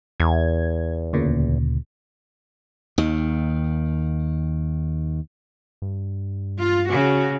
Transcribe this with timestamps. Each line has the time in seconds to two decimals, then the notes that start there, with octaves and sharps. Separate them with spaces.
0.20 E2 G#6
1.13 D2 A#2 C#3
2.98 D#2 D#3
5.82 G2
6.59 F4
6.89 C#3 F#4